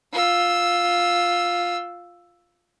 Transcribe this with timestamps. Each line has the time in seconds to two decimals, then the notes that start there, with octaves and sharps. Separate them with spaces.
0.12 F4 E6